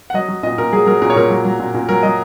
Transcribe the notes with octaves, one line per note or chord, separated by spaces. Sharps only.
F#5
F#3 D#5
F#3
A#2 D#5
A#2 A#4
F#3 G#4
F#3 A#4
A#2 A#4
C#5
A#2 A#4
F#3
F#3
A#2
A#2
F#3 A#4
F#3 D#5